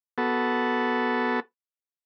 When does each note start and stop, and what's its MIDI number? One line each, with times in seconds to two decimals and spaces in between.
0.18 1.40 59
0.18 1.40 66
0.18 1.40 69